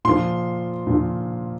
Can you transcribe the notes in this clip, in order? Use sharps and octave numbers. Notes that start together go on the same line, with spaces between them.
A#2 F3 C6
A#2 F3